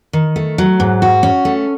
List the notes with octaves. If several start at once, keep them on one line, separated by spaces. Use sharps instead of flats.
D#3
A3
F#3
G#2
F#4
C#4
A3